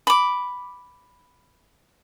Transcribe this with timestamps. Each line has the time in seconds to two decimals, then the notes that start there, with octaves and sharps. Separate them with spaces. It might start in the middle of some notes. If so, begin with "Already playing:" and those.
0.07 B5 D6